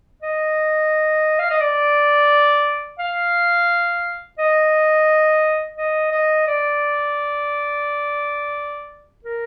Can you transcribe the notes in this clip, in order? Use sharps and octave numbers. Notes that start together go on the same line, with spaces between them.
D#5
F5
D#5
D5
F5
D#5
D#5
D#5
D5
A#4